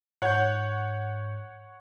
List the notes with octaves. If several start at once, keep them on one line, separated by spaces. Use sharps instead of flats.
G#2 C#5 F#5 G6